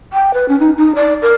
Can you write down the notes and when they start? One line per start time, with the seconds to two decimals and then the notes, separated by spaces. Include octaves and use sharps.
0.13 G5
0.34 B4
0.48 C#4
0.60 D#4
0.77 D#4
0.95 D5
1.22 A#4